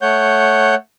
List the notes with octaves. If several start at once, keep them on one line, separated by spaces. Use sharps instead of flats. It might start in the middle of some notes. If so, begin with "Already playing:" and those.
A3 C#5 F#5 G6